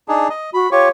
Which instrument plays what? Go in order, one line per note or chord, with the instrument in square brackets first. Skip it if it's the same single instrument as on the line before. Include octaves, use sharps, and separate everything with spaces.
[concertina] D4 D#4 G#4
D#5
[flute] F#4 [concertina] B5
[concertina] F4 G4 C#6 [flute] C#5